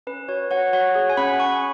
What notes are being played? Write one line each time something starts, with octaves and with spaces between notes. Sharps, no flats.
C#4 B4
F#4 C#5
F#4 C#5 F#5
F#4 C#5 F#5
G#4
G#5
C#4 F#5 B5
C#4 G#5 C#6